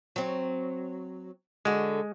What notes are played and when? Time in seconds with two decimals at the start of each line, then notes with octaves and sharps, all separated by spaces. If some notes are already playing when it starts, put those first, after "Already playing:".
0.16 F#3 C4
1.65 D3 G#3 F#4